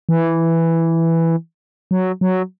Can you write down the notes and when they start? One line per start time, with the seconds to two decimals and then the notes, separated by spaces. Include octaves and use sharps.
0.09 E3
1.91 F#3
2.21 F#3